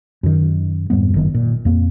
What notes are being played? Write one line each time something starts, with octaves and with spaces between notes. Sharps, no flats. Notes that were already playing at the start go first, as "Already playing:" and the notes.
F#2 D#3
F2 G#2 G3 B3
F#1 D#3
A#2
F2 A#3 C4